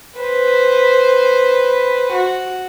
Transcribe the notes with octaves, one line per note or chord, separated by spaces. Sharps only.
B4 C5
F#4